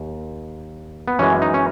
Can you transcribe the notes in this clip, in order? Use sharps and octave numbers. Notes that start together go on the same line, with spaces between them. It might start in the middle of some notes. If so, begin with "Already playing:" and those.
Already playing: D#2
B3
F#2 E3 G#3 C#4
D#4
C#4